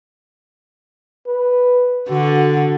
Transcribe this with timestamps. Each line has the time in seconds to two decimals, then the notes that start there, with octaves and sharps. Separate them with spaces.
1.27 B4
2.09 D3 F#4